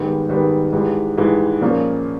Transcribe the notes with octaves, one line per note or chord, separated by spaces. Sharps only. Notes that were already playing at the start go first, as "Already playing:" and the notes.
Already playing: G#2 D#3 G3 B3
G#2 D#3 G3 B3
G#2 E3 G3
G#2 E3 G3
A#2 F3 A#3 C#4